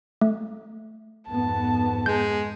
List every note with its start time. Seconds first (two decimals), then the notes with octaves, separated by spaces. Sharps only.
0.21 A3
1.29 F2 G#2 B3 A5
2.06 G#3 G6